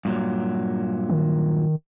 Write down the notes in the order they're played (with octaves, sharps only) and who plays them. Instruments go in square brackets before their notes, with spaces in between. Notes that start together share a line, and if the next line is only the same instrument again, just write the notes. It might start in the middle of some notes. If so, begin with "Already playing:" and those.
[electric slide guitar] G2 A#2 F#3
[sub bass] D#3